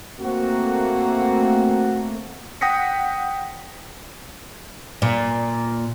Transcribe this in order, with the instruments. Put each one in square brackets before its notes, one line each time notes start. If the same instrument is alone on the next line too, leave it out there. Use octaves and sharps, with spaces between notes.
[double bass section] A3 A#3 [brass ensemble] C4 F#4
[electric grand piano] F#5 G5 D#6 A#6 B6 C#7
[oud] A#2